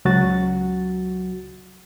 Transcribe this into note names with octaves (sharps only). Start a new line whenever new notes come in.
C#2 F#3 F#4 A6